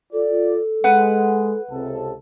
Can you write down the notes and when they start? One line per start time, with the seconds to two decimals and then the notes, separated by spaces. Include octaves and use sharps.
0.13 F4 A4 D5
0.84 G#3 B4 F#5
1.70 C#2 C3 A4